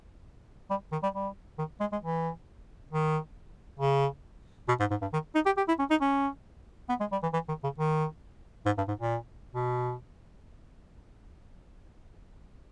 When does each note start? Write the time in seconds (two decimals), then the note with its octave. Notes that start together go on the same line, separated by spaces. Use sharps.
0.70 G3
0.92 D#3
1.03 G3
1.15 G3
1.59 D#3
1.81 G#3
1.92 G#3
2.03 E3
2.91 D#3
3.80 C#3
4.68 B2
4.80 G#2
4.91 G#2
5.02 G2
5.13 D#3
5.35 D#4
5.46 G4
5.57 G4
5.68 E4
5.79 C#4
5.90 D#4
6.01 C#4
6.89 B3
7.00 G#3
7.12 G3
7.23 E3
7.33 E3
7.49 D#3
7.64 C#3
7.78 D#3
8.66 G#2
8.78 G2
8.88 G#2
8.99 A#2
9.55 B2